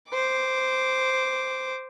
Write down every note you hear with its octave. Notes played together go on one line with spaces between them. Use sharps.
C5 D6